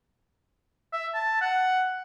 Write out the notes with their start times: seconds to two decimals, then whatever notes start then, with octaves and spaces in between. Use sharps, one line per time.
0.93 E5
1.14 A5
1.41 F#5